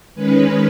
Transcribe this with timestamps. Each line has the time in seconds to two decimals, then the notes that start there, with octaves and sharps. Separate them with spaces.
0.15 D#3 G#3 C#4 B4